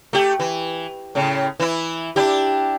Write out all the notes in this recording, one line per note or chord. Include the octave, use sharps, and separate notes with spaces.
A3 G4
E3
A2 C#3
E3 E4
D4 E4 G4